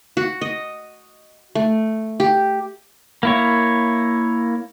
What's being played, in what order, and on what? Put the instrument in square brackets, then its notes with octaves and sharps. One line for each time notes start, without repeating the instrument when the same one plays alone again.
[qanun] F#4
D#5
A3
G4
[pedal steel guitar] A#3 E4 C#5